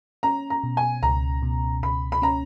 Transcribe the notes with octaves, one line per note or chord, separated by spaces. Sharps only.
C#4 A#5
A#5
B2
G#5
C#2 A#5
B2
C#2 B5
B5
C#4 A#5